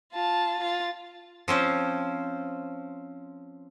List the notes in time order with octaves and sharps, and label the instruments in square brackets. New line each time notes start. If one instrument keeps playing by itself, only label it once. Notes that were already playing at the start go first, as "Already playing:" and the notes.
[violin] F4 A5
F4 A6
[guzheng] F3 C4 C#4 C5